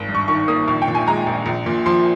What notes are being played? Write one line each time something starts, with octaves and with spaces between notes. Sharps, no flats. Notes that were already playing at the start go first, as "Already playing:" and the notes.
Already playing: G#1
G2
C#6
D#3 C#6
A#3 D#6
A#1 C#6
G5
A#2
G#5
G#3 A#5
A#1
A#1
A#2
F3 C6